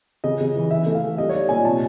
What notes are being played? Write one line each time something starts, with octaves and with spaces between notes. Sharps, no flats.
C#3 D#5
C#3
E3
E3 E5
A3
F5
E3
G3 D#5
C#5
D#4 D5
A#2 G#5
C3 A5